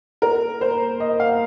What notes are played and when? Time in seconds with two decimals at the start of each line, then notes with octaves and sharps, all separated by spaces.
0.22 A#4
0.61 C5
1.00 D#5
1.20 F5